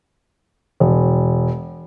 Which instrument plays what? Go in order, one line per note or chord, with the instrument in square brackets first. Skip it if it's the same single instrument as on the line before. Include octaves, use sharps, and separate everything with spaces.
[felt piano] E1